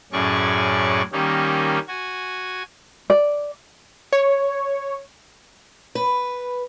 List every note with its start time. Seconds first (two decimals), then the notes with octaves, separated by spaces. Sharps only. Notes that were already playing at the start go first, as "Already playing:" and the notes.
0.12 F#2 A2 C#4 G#4 D5 C#6
1.12 D#3 G3 A#3 C#4 D#4
1.88 F#4 G#5
3.10 D5
4.13 C#5
5.95 B4